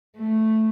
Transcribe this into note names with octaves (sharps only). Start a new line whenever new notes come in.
A3